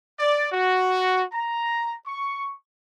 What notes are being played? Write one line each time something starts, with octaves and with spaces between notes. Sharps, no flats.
D5
F#4
A#5
C#6